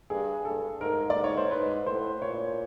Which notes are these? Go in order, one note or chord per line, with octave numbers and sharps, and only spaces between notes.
G2 G#4
G2 A4
G#2 A#4
D5
G#2
C#5
C5
G#2 B4
A2 C5
A#2 C#5